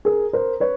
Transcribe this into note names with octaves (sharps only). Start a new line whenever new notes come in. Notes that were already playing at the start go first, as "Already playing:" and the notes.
G#4 A#4
A#4 C5
B4 C#5